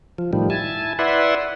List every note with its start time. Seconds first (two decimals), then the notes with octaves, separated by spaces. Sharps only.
0.18 F3
0.33 A2 D#3 F3 G3
0.50 E4 G#5 A5
0.99 E4 B4 D5 E5 F#5 C6